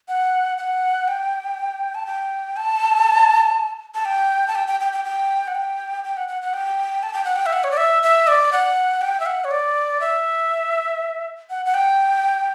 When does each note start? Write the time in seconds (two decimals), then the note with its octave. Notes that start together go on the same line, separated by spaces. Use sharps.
0.08 F#5
0.58 F#5
1.08 G5
1.95 A5
2.06 G5
2.57 A5
3.95 A5
4.05 G5
4.48 A5
4.55 G5
4.68 G5
4.80 G5
4.93 G5
5.05 G5
5.47 F#5
5.55 G5
6.04 G5
6.17 F#5
6.28 F#5
6.42 F#5
6.54 G5
7.03 A5
7.13 G5
7.25 F#5
7.36 G5
7.46 E5
7.53 F#5
7.64 C#5
7.71 D5
7.77 E5
8.03 E5
8.27 D5
8.52 F#5
9.01 G5
9.20 E5
9.26 F#5
9.44 C#5
9.51 D5
10.01 E5
11.50 F#5
11.66 F#5
11.74 G5